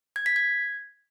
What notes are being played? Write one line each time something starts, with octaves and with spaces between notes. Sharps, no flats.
G#6
B6
G#6